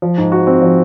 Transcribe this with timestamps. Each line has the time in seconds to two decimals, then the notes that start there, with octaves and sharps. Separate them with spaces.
0.02 F3
0.18 G#2
0.32 F#4
0.47 C4
0.62 F3